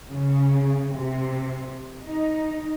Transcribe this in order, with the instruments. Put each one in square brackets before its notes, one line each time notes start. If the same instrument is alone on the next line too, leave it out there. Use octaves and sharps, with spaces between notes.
[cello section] C#3
C3
D#4